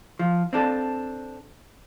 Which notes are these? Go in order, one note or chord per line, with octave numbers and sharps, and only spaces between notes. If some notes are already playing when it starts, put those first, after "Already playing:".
F3
C4 D4 A4